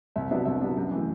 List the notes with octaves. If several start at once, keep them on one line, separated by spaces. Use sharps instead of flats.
C2 E5
C3 F#3 B3 D4 E5
C2 E5
C3 F#3 B3 D4
F#2
E3 A3